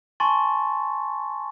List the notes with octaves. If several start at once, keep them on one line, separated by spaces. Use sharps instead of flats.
G#5 A5 C6 C#6 A6